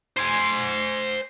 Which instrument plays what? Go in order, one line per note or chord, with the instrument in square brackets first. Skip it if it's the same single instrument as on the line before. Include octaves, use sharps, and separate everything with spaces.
[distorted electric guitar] C5 G#5